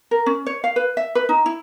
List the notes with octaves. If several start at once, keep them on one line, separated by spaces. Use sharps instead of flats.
A#4
C#4
C#5
F5
B4
E5
B4
D#4
E4